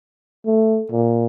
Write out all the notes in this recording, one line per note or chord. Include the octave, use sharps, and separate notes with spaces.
A3
A#2